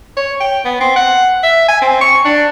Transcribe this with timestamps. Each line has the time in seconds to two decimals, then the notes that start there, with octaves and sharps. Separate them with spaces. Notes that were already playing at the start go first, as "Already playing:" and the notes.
0.17 C#5
0.40 G5
0.65 B3
0.80 C4
0.96 F#5
1.43 E5
1.68 G#5
1.82 C4
2.01 C#6
2.25 D4